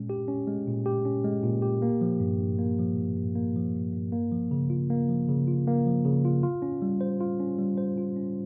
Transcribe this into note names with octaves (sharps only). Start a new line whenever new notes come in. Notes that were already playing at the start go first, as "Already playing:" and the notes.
Already playing: A#2 G#3 C#4
G4
C#4
G#3
A#2
G4
C#4
G#3
A#2
G4
A#3
F3
G2
G2
A#3
F3
G2
G2
A#3
F3
G2
G2
A#3
F3
C#3
F4
A#3
F3
C#3
F4
A#3
F3
C#3
F4
F4
C#4
G3
C5
F4
C#4
G3
C5
F4
C#4